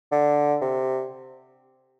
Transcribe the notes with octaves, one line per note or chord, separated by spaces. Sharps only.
D3
C3